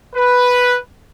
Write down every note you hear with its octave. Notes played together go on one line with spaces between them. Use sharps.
B4